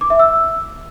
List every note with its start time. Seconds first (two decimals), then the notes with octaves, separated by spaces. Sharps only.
0.01 D6
0.10 E5
0.19 E6